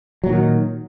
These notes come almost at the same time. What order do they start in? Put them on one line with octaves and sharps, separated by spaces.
F#3 A#2 D#3